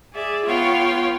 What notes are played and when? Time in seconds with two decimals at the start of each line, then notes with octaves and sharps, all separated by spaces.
0.14 G#4 D5 E5
0.47 B3 F4 C#5 F5 G5